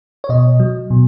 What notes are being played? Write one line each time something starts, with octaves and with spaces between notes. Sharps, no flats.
C#5
B2 D#5
F#3
B2